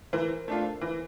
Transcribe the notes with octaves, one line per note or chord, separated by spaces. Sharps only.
E3 A#4 C5
A3 D4 F4
E3